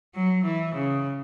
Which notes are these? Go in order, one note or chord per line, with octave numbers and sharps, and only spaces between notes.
F#3
E3
C#3